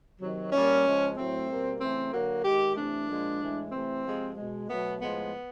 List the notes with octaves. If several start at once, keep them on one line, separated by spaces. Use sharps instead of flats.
C3 D#3 F#3
A#2 G3 A#3 C#4
C#3 F3 G#3
A2 F#3 A3 C4
B2 G3 A#3
C#3 E3 A3 C4
D3 F#3 A#3 F#4
D#3 G#3 G4
C3 E3 A3 D4
A#2 F3 G#3
A2 E3 G#3
C3 E3 A3 C4
C3 F3 G#3
B2 G#3
B2 F#3 A3 B3
A2 F3 G#3 B3